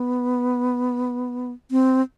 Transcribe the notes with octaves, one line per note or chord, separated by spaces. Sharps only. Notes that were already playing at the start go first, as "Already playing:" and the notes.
Already playing: B3
C4